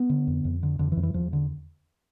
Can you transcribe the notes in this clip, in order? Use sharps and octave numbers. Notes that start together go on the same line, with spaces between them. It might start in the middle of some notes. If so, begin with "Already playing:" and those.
Already playing: B3
D3
F2
F2
D3
F2 D3
E3
F2
E3
E2 F3
D3